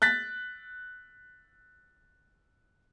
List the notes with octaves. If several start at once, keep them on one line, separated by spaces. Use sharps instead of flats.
F#6 A6 B6